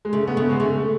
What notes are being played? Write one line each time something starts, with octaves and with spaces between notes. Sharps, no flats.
G#3
C#3 A3
B3
C#3 A3
G#3
C#3 A3